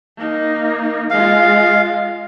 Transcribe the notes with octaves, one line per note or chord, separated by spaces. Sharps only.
A#3 D#4
G#3 F4 F5